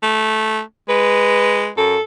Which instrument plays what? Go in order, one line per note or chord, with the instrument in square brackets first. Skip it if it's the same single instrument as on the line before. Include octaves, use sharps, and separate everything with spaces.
[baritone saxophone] A3
[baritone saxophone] G#3 [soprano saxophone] B4
[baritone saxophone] F#2 [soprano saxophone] A4